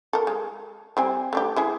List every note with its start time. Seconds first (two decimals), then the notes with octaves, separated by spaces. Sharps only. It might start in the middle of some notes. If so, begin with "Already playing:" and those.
0.13 A4 A#4
0.27 G#3
0.97 G3 C4 G#5
1.33 A3 D4 G4
1.56 G#3 E4 G#4